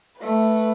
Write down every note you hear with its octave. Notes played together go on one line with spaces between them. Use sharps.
A3 B4